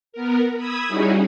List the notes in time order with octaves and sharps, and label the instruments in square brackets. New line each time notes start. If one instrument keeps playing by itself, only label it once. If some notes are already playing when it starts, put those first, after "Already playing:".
[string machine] B3 A#4
B5 D#6 E6 G#6
G3 C#4 D#4 E4 F#4 G#4